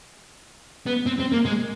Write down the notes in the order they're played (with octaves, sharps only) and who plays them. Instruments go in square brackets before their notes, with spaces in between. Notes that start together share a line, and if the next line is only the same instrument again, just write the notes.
[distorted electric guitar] B3
C4
C4
A#3
G#3